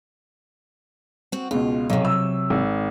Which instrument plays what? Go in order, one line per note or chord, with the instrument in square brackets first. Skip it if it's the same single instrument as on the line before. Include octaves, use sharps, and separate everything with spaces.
[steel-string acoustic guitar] C4 F#4
[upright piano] C#2 B2 [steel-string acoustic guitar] F4
[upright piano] B1 [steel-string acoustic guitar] C3 F#3
[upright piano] E6
G#1